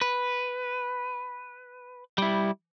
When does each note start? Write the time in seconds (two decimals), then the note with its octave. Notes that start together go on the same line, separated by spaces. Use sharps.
0.01 B4
2.18 G3 E4